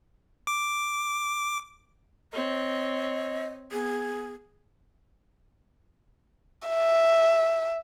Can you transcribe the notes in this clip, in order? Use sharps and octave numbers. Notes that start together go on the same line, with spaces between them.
D6
C4 C#5 D#5
B3 G#4
E5